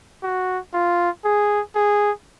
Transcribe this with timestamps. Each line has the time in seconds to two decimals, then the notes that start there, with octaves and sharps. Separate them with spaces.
0.23 F#4
0.74 F4
1.25 G#4
1.76 G#4